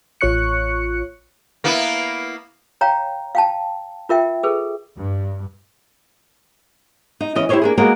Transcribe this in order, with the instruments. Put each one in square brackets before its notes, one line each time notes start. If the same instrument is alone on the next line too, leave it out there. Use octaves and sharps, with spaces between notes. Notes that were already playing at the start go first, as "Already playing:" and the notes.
[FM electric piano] A1 F4 C#5 C#6 F#6 C#7
[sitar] A#3 B3 E4
[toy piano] C#5 F5 G5 A#5
F5 G5 A5
F4 A#4 E5 G5
G#4 A4 B4
[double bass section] G2
[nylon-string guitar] D#4
E3 C#4 D#5
E4 G4 A#4 C5 C#5 D#5
A#3 D4 G#4
G#3 A#3 B3 F#4 G#4